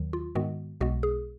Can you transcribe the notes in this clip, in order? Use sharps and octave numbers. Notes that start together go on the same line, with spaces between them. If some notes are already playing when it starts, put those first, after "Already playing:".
Already playing: D#2 D#3 F#3
F4
G#2 D#3 G#3 B3 F#4
B1 B2 G#3 B3 F#4
G#4